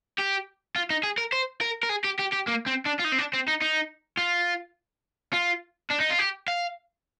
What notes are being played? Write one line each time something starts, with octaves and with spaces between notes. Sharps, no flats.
G4
F4
D#4
G#4
A#4
C5
A#4
A#4
G#4
G4
G4
G4
A#3
C4
D4
F4
D#4
C4
D4
C4
D#4
D#4
F4
F4
D4
D#4
F4
G4
F5